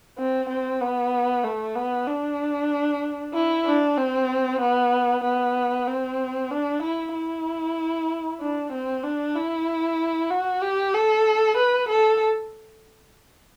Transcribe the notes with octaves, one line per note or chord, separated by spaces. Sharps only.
C4
C4
B3
A3
B3
D4
E4
D4
C4
B3
B3
C4
D4
E4
E4
D4
C4
D4
E4
F#4
G4
A4
B4
A4